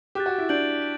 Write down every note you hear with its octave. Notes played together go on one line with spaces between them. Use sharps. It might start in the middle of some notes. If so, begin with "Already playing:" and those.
G4 D6 F#6 A6
F#4
E4
D4 G6 D7 F#7
D7